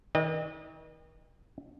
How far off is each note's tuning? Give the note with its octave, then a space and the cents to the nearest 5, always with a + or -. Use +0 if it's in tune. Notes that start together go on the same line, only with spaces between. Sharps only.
D#3 +45 D#5 -35